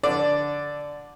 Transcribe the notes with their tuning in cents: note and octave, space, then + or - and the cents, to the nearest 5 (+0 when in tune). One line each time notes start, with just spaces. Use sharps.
D3 -10 D5 +0